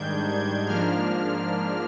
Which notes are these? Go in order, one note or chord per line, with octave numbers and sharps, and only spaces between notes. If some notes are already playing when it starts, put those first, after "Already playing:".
Already playing: G#2 D#3 G3 D4 G6 G#6
G#6
G#2 F3 A#3 D4 F6